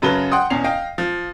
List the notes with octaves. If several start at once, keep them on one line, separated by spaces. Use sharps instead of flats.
F#2 C#3 F#3 B4 A5 G7
F#5 G5 C6 D#6
E2 B2 C#4 C7 F7
D#5 F5 G5
F3